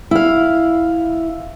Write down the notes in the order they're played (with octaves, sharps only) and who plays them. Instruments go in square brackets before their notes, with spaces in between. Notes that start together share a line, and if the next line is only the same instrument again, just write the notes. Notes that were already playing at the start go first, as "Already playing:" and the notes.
[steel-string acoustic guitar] E4 F5